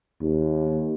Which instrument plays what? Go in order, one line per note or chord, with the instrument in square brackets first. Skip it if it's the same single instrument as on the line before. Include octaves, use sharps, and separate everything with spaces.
[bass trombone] D#2